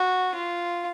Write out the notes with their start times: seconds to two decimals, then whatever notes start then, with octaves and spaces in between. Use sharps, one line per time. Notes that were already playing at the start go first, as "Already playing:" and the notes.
Already playing: F#4
0.35 F4